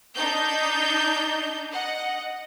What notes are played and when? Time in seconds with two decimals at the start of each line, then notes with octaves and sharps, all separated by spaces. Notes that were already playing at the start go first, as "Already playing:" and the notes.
0.15 D4 D#4 G6
1.71 D#5 F#5